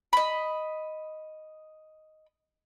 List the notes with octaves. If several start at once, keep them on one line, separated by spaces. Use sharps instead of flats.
D#5 B5